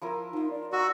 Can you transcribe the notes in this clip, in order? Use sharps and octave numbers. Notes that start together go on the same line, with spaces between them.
F3 E4 A#4
F3 D#4 F4
D5
D#4 F#4 E6